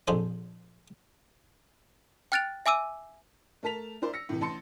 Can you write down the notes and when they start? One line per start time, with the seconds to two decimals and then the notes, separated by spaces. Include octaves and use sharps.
0.07 A#1 F2 D3 C5 E5 G#5
2.32 G5 F6 F#6 A6 D7 F7
2.66 E5 G#5 D6 E6 D#7
3.63 A3 A#4 A5 B6 F7
4.02 E4 A#4 C5 D5
4.13 E6 A#6 C#7
4.29 A2 C3 E3
4.41 A1 A5 C6 C#7